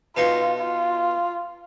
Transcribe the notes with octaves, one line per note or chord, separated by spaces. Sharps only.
B2 D#4 F4 C6
F4